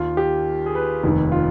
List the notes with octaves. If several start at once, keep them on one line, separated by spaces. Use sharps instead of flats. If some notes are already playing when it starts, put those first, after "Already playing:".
Already playing: D#2 D#3 F4
G4
G#4
B4
F1 D#2 D#3
F4